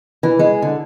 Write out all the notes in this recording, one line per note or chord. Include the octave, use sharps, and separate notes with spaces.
E3
G#3
D3